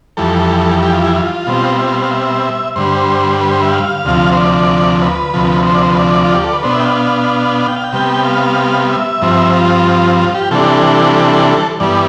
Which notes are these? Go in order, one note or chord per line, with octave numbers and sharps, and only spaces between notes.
F2 E3 G3 A4
G4
F4
E4
F4
B2 G3 C4
E5
F5
F5
E5
G2 D3 G3 C5
B4
C5
E5
F5
D2 C3 F3
C5
D5
B4
D2 C3 F3
C5
D5
C5
B4
D5
F4
G4
A4
B4
B2 B3 D4 C5
E5
G5
F5
F5
F5
G5
F5
G5
C3 G3 B3
F5
E5
G2 F3 C4
F4
F4
G4
C3 E3 G3 D4 A4
G2 E3 G3 B3 D5